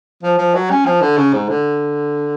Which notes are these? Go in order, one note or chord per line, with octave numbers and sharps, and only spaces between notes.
F3
F3
F#3
C#4
F3
D3
C#3
G#2
D3